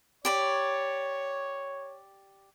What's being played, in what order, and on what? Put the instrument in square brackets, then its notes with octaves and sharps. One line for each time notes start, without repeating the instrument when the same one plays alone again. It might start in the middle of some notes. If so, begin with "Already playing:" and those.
[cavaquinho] G4 D5 B5 [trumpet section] C#5